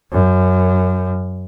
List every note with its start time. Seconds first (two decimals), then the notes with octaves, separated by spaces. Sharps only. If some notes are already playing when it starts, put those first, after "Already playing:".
0.12 F#2